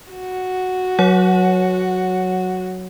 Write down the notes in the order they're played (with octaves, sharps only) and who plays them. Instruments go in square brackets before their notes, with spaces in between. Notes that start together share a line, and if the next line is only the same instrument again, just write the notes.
[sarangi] F#4
[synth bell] F#3 C#5 F#5